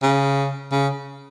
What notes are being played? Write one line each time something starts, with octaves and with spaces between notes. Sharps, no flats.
C#3
C#3